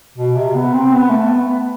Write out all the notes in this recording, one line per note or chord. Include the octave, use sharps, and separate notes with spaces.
B2
C3
B3
C4
B3
A3
B3
B3